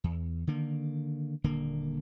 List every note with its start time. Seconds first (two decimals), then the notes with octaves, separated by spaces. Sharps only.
0.04 E2
0.47 D3 D#3 A#3
1.44 D#1 D3 A#3